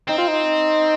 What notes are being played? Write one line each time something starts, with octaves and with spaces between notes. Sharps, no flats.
C4 D#4
F4
D#4